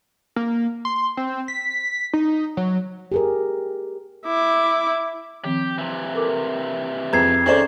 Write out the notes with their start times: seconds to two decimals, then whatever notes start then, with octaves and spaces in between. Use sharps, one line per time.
0.36 A#3
0.85 C6
1.17 C4
1.48 B6
2.13 D#4
2.57 F#3
3.12 G4 G#4 A#4
4.26 E4 D6
5.45 D#3 F3 C4 G4
5.78 C3 E3
6.14 A4 A#4 D6
7.13 F2 G#4 B4 C5 A#5 G#6 C7
7.46 D#3 C#4 G#4 A4 C5 D5 E5